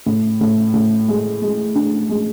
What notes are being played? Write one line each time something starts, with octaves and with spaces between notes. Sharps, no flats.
A2
A2
A2
G#3
G#3
D4
G#3